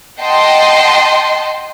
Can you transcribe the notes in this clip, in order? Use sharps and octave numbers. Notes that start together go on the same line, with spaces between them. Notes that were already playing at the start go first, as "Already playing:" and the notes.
D#5 F#5 G5 A5 C6